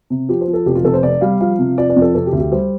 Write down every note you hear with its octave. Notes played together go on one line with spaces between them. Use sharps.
C3
F3 G4
C5
F3
A4
F1 G4
F4
F1 A4
C5
C3 D5
G3 F5
F3 F5
C3
F3 D5
D5
F2
A4
C3 A4
G4
D2
G4
G3 C5